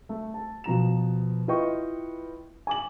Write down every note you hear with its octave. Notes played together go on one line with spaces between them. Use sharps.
A3
A5
B2 F3 A#5 E7
E4 F4 B4 D#5 G5 C#6
G#5 D6 F#7